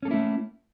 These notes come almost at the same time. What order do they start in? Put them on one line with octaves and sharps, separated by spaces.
C#4 A4 A#3 E4 A3